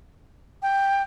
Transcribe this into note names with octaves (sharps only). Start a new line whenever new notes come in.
G5